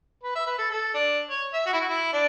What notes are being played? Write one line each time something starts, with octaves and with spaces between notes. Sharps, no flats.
B4
E5
B4
A4
A4
D4
C#5
E5
F#4
E4
F#4
E4
D4